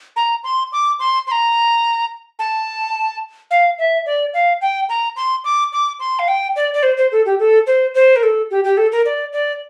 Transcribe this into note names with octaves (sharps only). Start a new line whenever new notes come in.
A#5
C6
D6
C6
C6
A#5
A5
F5
E5
D5
F5
G5
A#5
C6
D6
D6
C6
F5
G5
D5
D5
C5
C5
A4
G4
A4
C5
C5
A#4
A4
G4
G4
A4
A#4
D5
D5